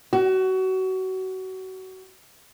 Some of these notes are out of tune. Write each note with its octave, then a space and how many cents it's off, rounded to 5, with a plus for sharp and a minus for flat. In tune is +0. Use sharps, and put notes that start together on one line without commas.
F#4 +25